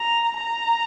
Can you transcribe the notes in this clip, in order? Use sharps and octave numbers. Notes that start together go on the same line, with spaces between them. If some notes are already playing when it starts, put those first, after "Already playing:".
Already playing: A#5
A#5